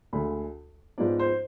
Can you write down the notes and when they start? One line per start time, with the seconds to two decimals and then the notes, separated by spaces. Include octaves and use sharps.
0.13 D2 D3 G#3 B5
0.98 G#2 F3 B3 D5
1.19 C5